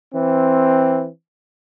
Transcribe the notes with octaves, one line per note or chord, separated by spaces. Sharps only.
E3 C4